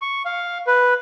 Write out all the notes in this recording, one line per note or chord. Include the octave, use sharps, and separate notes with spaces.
C#6
F5
B4